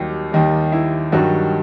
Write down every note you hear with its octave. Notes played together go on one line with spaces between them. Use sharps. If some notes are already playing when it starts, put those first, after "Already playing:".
Already playing: D#2 D#3 F#3 G3 G4
D#2 D#3 G3
E4
G2 D#3 F#3 G3 F#4